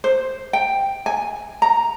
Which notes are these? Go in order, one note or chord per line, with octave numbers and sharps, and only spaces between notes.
C5
G5
G#5
A#5